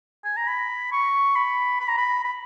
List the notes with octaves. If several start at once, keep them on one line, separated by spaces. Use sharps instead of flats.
G#5
A#5
B5
C#6
B5
B5
A#5
B5
B5